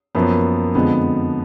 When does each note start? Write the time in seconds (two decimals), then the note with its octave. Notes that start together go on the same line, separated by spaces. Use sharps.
0.15 F#2 F3 A#3 B3
0.75 F2 D3 F3 G#3 B3